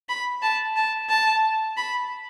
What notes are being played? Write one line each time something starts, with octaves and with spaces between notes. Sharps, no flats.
B5
A5
A5
A5
B5